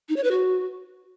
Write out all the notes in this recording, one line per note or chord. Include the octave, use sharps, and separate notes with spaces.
D#4
C#5
B4
F#4